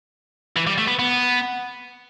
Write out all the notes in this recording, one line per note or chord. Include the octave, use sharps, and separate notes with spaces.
E3
G3
A3
B3
B3